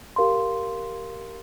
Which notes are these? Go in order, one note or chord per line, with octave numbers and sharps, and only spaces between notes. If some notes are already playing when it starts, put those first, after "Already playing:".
G4 A#4 F5 C6